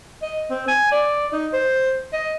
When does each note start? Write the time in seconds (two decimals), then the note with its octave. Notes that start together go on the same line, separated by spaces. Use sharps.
0.22 D#5
0.50 C4
0.67 G#5
0.92 D5
1.33 D#4
1.53 C5
2.13 D#5